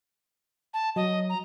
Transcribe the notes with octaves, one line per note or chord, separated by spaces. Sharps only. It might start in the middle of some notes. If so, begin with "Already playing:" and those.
A5
F#3 D#5
A#5